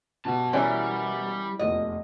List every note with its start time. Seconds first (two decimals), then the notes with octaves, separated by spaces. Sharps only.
0.25 B2 G4 A5
0.53 E3 G3 C#4 E4 A#4 D5
1.59 F1 E2 A#2 D#5